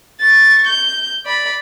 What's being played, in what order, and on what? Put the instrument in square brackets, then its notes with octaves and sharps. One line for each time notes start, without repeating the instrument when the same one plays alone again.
[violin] C#6 A6
G6
D5 B5